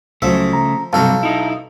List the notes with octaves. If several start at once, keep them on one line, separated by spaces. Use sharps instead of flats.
C#2 C#3 F3 F#3 A3 E5
A#5
B1 G2 C3 F#3 A4 F5 A5 A#5
D#4 E4